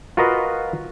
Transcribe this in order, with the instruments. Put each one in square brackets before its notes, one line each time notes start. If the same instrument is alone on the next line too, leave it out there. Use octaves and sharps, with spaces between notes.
[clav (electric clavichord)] F4 F#4 A#4 B4 D#5 F5